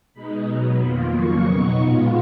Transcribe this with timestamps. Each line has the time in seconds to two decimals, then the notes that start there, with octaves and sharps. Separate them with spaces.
0.14 B2 G#3 D#4 B5
0.47 B2 F#3 B3 A#5
0.80 F2 D#3 A#3 F4 B5
1.13 F2 C#3 F#3 A#3 C#6
1.46 B2 F#3 B3 D#4 C#6
1.79 A#2 G#3 B3 F4